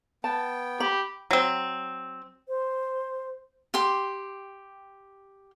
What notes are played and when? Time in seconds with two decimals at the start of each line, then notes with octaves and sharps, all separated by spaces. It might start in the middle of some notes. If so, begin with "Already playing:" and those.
0.24 B3 G5 A5
0.80 G4 B5
1.31 F#3 C4
2.48 C5
3.74 G4 G5 C6 D6